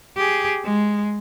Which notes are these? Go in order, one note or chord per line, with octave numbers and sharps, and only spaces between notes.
G4 G#4
G#3